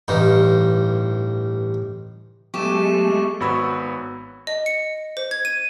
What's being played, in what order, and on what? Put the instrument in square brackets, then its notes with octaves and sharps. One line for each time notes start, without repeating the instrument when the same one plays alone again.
[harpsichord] A1 G2 D#4
[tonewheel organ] F#3 B3 [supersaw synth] G#3 A3 [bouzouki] G4 [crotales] C#6 D6 E7
[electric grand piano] G#1 B3 F#4 C#5 B5 E6
[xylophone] D#5
C#7
C5
G#6
D#7